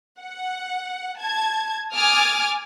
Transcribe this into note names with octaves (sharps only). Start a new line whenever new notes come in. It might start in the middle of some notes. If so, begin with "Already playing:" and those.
F#5
A5 G#6
G#5 D6 D#6 F6 G#6 A6